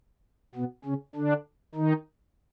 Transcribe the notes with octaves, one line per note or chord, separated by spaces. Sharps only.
B2 B3
C#3 C#4
D3 D4
D#3 D#4